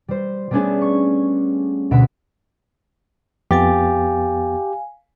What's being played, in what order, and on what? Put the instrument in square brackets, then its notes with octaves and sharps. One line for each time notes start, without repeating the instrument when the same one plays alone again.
[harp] G3 C5
G3 A3 B3 C#4 D4 G#4
C#6
D2 B2 E5 F#5 B5 D7
[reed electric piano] F2 B3 A6 [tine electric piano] G4 [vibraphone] F5 G#5